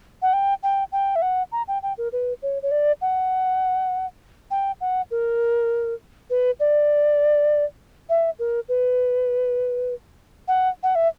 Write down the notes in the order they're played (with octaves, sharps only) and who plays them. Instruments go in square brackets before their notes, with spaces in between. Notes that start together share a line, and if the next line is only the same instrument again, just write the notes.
[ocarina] F#5
G5
G5
G5
E5
F#5
A#5
G5
G5
A#4
B4
C#5
C#5
D5
F#5
G5
F#5
A#4
B4
D5
E5
A#4
B4
F#5
F#5
E5